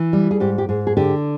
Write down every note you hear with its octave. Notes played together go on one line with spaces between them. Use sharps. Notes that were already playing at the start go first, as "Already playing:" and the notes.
Already playing: E3
G3
G#4
G#2 G4
G4
G#2 G#4
G#4
D3 G4